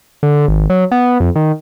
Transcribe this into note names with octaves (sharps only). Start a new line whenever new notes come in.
D3
G#1
F#3
B3
F2
D#3